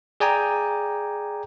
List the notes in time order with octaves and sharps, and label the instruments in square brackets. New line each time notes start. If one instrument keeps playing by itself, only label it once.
[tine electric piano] G#4 D5 G5 G#5 A#5